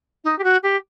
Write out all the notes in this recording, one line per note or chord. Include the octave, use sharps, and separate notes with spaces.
D#4
G4
F#4
G4